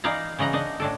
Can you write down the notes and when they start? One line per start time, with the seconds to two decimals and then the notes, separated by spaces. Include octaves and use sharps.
0.04 E3 D#4 D5 F5 A#5
0.39 C#3 E3 D#5 F#5 A#5
0.53 D4 D#4 D#5
0.80 A2 D4 A4